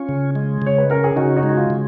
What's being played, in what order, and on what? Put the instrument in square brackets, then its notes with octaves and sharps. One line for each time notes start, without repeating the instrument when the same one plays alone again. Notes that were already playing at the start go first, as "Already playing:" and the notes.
Already playing: [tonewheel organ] C#4 [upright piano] F4
[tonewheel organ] C#3
G#3
[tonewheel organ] C#3 [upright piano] C#5
[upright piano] B4
[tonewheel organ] C#4 [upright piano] A#4
[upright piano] G#4
[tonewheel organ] C#3 [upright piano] D#4 F#4
[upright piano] D#4 F#4
[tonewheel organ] G#3
[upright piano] F#4
F4
[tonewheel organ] C#3